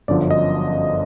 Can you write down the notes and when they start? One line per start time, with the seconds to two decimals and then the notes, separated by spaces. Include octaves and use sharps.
0.08 G1 F#2 D3 F3 D5
0.31 D#5